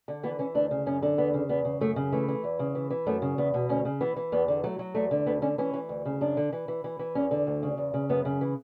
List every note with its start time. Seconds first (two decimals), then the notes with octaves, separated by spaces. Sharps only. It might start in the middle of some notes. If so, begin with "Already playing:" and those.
0.08 D3
0.23 E3 B3
0.39 E3 C#4
0.54 D2 D4
0.71 C#3
0.86 F#2 C#4
1.02 D3
1.17 E2 B3
1.34 C#3
1.49 E2 B3
1.65 C#3
1.81 F#2 A3
1.96 C#3
2.12 E3 A3
2.28 E3
2.44 E2
2.59 C#3
2.75 E3
2.90 E3
3.07 F#2 A3
3.22 C#3
3.38 E2 B3
3.54 B2
3.69 D2 C#4
3.85 C#3
4.01 E3 B3
4.16 E3
4.32 E2 B3
4.48 D3
4.64 F#3 A3
4.79 F#3
4.95 E2 A3
5.11 D3
5.26 D2 B3
5.42 D3 C#4
5.58 E3 C#4
5.74 E3
5.89 D2
6.05 C#3
6.21 F#2 D4
6.37 D3
6.52 E3
6.68 E3
6.84 E3
6.99 E3
7.15 E2 C#4
7.31 D3
7.47 D2
7.63 C#3
7.78 E2
7.94 C#3
8.09 F#2 B3
8.25 C#3
8.41 E3